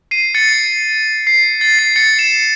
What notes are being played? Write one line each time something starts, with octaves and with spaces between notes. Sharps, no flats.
C7 D#7
A6 C#7
C7
A6
C7
A6 C#7
C#7 E7